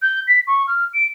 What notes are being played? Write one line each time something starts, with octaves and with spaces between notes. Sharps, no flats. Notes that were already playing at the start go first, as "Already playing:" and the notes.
G6
B6
C#6
F6
D7